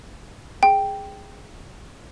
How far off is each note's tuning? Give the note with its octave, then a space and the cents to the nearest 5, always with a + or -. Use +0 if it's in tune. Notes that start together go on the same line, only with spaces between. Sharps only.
G#4 +0 G5 +0